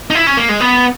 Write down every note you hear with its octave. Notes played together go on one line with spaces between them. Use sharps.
D#4
E4
C#4
A#3
G#3
B3